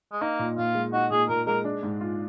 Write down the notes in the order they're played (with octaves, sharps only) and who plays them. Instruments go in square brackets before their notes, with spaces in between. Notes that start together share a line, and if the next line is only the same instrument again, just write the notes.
[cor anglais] G#3
[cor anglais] A#3 [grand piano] D#4
[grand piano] A#2
[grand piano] A#2 [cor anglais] F4
[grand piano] G#3
[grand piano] D#4 [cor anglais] F#4
[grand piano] A#2 [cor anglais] G#4
[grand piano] A#2 [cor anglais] A#4
[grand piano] G#3 [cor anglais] A#4
[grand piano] D4
G#2
F4